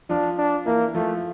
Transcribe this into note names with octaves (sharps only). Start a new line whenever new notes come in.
F3 D4 F4
D4
E3 A#3 E4
F3 A3 F4